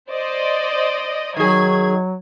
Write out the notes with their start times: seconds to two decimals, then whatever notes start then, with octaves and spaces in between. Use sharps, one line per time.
0.11 C5 D5 D#5
1.37 D#3 F#3 G#4 G#6